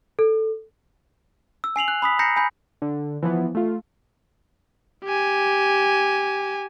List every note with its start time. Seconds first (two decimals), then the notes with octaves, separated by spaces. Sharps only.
0.19 A4
1.64 E6
1.76 G#5 C7 F7 F#7
1.88 F#6
2.02 B5 D#6 B6
2.19 A#5 G6 A#6 C7 C#7
2.36 G#5 B5 G6
2.82 D3
3.23 E3 F3 B3
3.55 A3 F4
5.04 G4 G#5